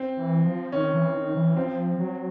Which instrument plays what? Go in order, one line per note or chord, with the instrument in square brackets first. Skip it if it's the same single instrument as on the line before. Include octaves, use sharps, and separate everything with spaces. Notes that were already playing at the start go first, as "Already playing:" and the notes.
Already playing: [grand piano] C4
[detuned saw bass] E3
F3
[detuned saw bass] D#3 [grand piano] C#4
[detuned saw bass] E3
D#3
E3
[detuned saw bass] F3 [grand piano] C4
[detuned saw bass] F#3